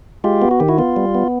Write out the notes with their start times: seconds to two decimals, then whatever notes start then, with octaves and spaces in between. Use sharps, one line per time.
0.24 G#3 F4 G4
0.42 B3
0.51 F#4
0.60 D#3 G4
0.69 E4 F#4
0.78 B3 F4
0.96 G3
1.15 B3